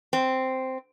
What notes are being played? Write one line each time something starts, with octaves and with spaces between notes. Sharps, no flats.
C4